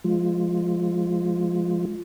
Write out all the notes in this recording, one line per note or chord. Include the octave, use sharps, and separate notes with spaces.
F3 G#3 F4